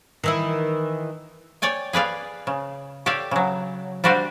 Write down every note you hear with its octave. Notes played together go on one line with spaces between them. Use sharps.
D#3 E3 E4
C#5 D5 G5 G#5
G#4 B4 D5 F5
C#3
G4 A4 C#5 D5 F5
C#3 F#3
G3 D4 F#4 G4 C5 F5